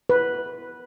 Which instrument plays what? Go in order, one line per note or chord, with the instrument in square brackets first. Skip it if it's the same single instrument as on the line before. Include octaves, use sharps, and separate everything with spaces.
[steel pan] B4